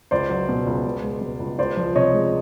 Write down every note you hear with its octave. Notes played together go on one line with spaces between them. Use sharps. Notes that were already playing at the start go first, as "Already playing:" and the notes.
C#2 C5 D5
F#3
B2
C#2
C#2
G#3
B2
C#2
C#2 C5 D5
F3
C3 C#5 D#5
G#3